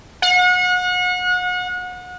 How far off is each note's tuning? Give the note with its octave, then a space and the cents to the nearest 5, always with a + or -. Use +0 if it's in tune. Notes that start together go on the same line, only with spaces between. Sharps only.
F#5 -35